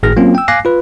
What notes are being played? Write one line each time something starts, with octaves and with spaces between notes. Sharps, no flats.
G#1 A2 G#4 F6 A#6
F#3 A#3 C4 C#4 F4
G5 E6
F5 G#5 D6 F#6 A#6 C7
F4 B4